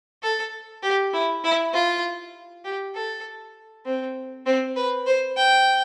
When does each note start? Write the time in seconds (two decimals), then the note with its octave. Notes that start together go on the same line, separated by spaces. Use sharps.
0.23 A4
0.83 G4
1.13 E4
1.44 E4
1.73 F4
2.65 G4
2.95 A4
3.86 C4
4.46 C4
4.76 B4
5.06 C5
5.37 G5